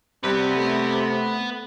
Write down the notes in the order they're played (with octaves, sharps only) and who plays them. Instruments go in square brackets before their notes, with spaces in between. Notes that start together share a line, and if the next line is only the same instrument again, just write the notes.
[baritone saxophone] C3 [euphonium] G3 [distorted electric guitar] B3 B4
[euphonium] A3